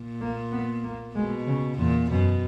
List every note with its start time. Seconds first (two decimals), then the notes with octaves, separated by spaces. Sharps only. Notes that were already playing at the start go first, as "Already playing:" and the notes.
Already playing: A#2
0.21 A#3
0.52 B3
0.84 A#3
1.15 B2 G#3
1.47 C#3
1.78 E2 A#2
2.10 F#2 B2